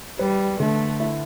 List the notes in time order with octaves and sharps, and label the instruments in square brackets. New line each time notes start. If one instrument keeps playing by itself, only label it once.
[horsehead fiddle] G3 [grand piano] B4
[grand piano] D3 [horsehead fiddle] A3
[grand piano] E4